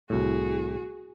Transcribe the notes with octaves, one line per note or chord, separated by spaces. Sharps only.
C2 A2 F#4 G#4